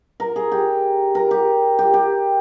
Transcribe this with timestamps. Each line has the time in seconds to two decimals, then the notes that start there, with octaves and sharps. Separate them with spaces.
0.20 A#4
0.36 G#4
0.52 G4
1.15 A#4
1.31 G4
1.79 G4
1.94 G4